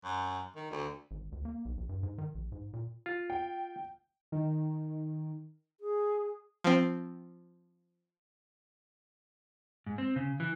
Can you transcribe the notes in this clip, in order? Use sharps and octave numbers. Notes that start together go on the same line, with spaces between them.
F#2
D#3
D2
G#1
D2
A#3
B1
A#1
G2
G#2
D#3
A#1
G#2
A#2
F4
G5
D#3
G#4
F3 C4
G#2
C4
C#3
E3